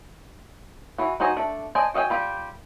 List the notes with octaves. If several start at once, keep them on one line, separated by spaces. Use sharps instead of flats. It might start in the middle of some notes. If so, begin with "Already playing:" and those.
E3 F#4
D#4 F#4 C5 D#5 G#5
A3 D4
C5 D5 D#5 G#5 A5
F#4 D#5 F5 G5 G#5
G3 F4 G4